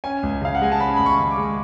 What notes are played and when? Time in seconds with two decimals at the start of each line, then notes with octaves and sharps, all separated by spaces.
0.04 C#4 G#5
0.23 C#2
0.41 C#3 F5
0.55 F#5
0.62 G#3 G#5
0.72 A5
0.80 C#4 B5
0.96 C#2 B5
1.06 C#6
1.18 C#3
1.31 D6
1.37 G#3